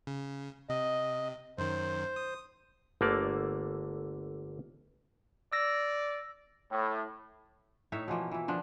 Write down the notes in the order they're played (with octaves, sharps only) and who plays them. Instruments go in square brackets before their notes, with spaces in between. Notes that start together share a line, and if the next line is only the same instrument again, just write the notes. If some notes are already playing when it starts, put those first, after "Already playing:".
[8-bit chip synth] C#3
[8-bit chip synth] C3 [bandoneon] D#5
[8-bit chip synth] F#2 D#3 [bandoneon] C5
[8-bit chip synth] D#6
[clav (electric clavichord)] G1 D3 A3 A#3 C#5 D5
[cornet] D5 [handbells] E6 A#6
[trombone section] A2
[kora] A2 D#4 C#5 E5
B2 E3 F3 A#3
E3 E4
D3 F3 D4